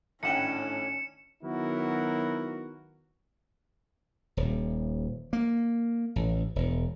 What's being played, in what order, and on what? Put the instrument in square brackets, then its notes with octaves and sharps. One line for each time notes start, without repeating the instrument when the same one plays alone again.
[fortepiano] G#1 F#5 G5 [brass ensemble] A2 D4 [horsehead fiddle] C#4 [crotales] C#7 E7
[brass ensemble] D#3 F#3 B3 E4 F#4 A#4
[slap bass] D#1
A#3
A1
E1